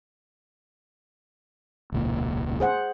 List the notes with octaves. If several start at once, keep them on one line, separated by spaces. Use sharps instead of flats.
E1 C#2 A#2
G#4 C5 F#5